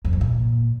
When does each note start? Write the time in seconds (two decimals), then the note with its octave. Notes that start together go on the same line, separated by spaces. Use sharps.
0.05 F2
0.13 G2
0.21 A#2